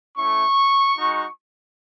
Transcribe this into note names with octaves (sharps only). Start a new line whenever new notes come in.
A3 C#4 E4 C#6
G#3 D#4 F#4